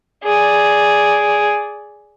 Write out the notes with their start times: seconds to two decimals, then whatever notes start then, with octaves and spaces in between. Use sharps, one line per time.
0.23 G#4 D5